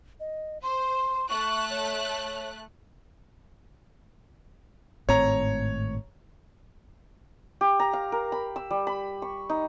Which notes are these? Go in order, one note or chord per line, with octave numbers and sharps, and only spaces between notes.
D#5
C5 C6
A3 C#6 F#6
C#5
G#1 A2 C4 C#5 A#5
G4
A#5
F5
A#4
B5
E6
G3
B5
C#6
D#4